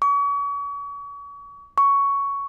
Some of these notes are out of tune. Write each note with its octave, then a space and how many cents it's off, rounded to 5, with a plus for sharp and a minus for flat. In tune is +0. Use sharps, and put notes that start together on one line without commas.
C#6 +40
C#6 +10